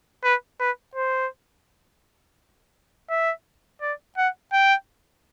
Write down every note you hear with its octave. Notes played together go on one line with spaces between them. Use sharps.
B4
B4
C5
E5
D5
F#5
G5